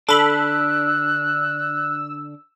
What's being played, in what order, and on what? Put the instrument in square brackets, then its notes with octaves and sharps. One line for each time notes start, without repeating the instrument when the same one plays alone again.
[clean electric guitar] D3 D4 [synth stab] A4 B5 [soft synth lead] E6 [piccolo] F#6